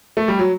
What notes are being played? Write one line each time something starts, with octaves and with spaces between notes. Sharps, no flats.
A3
G3
F#3